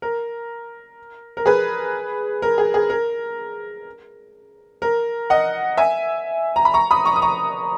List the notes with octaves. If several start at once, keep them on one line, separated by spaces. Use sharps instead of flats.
A#4
A#4
G#4 B4
A#4
G#4
G#4
A#4
A#4
D#5 F#5
E5 G#5
A#5
B5
A#5 C#6
B5 D#6
A#5 C#6
D#6
A#5 C#6